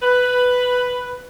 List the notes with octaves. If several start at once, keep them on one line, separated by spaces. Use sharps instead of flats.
B4